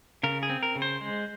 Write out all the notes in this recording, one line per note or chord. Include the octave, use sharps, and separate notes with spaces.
C#3 A#4
G#4
C4
A#4
C#3
C5
G#3